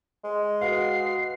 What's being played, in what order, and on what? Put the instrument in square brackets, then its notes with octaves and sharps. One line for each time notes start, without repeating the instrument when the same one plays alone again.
[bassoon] G#3
[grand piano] F#4 B4 F5 [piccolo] C7